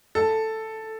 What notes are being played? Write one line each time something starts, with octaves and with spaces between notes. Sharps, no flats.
A4